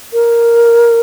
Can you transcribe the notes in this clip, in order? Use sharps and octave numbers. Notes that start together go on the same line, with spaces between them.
A#4